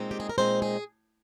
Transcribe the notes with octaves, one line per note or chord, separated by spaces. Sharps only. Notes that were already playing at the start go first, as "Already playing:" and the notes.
Already playing: A#2 G#3 C4 D#4
G4
G#4
A#4
A#2 G#3 C4 D#4 C5
G#4